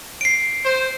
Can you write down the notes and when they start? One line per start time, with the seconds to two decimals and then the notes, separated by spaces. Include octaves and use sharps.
0.21 C7 D7
0.65 C5